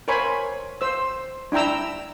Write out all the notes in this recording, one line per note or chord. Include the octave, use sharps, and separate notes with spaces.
A#4 C5 C#5 G#5 B5
C5 E6
D4 E4 G5 A#5 E6